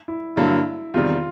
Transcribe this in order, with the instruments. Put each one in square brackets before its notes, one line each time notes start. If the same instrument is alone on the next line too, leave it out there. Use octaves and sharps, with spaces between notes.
[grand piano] E4
[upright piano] G2 D3 F#3 A#3 [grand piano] E4
[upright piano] E2 C3 D#3 G3 [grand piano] F4